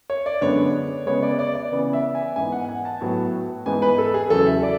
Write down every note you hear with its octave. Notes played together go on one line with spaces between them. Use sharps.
C#5
D5
F#2 D3 G#3 B3 C#5
C#3 G#3 B3 C#5
D5
D5
D5
C#3 E3 B3
E5
G#5
G#2 E3 B3 G#5
F#5
F#5
G#5
A5
A2 F#3 B3
G#2 E3 G#3 B3 G#5
B4
A4
G#4
E2 C#3 F#3 A4
E5
D5